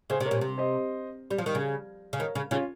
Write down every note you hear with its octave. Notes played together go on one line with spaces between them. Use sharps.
C#3 G#4 C5
C3
A#4 C#5
A#2
C3
C5 D#5
G3
F3
D#3
C#3
C#3
D#3 A#4 C#5
C#3
C#3 C#4 F4